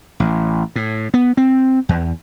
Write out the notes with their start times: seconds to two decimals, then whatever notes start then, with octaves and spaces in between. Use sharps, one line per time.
0.20 A1
0.76 A2
1.14 B3
1.37 C4
1.89 E2